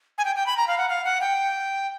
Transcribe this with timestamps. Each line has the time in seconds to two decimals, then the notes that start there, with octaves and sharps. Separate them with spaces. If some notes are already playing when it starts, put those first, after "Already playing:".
0.18 G#5
0.25 G5
0.36 G5
0.46 B5
0.57 A#5
0.68 F5
0.78 F#5
0.89 F5
1.05 F#5
1.21 G5